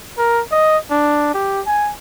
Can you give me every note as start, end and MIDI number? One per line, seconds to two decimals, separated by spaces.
0.18 0.42 70
0.52 0.78 75
0.91 1.29 62
1.34 1.61 67
1.67 1.92 80